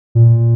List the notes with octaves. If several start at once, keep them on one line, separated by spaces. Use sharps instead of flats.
A#2